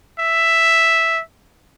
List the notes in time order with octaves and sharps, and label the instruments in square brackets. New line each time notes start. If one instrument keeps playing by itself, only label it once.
[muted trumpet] E5